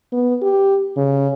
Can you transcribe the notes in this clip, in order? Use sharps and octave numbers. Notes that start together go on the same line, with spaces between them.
B3
G4
C#3